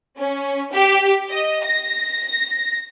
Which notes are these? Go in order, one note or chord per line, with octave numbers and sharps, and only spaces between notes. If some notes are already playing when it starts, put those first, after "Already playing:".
C#4
G4
D#5
A#6